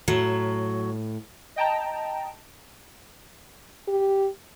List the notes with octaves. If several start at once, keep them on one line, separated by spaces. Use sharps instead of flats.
A2 F#3
D#5 G5 A5 A#5
G4